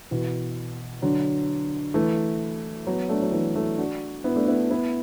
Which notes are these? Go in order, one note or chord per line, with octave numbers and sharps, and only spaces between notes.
B2 E3
D3 F#3
E3 A3
F#3 B3
A3 D4
F#3
E3 A3
E3 A3
D4 F#4
B3 E4
A3 D4
B3 E4
B3 E4